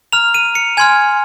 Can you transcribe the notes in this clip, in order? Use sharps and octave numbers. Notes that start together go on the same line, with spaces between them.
A#5 F6 F7
D#7
C#7
G#5 C6 F6 G#6